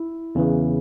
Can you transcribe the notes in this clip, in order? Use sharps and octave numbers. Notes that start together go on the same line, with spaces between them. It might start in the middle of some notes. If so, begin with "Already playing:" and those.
Already playing: E4
E2 C#3 E3